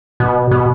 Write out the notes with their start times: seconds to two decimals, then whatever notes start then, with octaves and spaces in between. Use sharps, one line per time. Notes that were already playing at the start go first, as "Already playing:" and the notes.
0.20 B2
0.51 B2